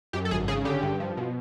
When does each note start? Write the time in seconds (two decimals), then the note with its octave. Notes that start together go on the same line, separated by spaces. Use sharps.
0.13 F#2 G4
0.25 A4
0.31 G#1 G#4
0.48 C#3 G#4
0.65 D3 G4
0.83 G2
1.00 F3
1.17 B2